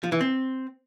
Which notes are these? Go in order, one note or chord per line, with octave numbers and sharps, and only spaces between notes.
F3
E3
C4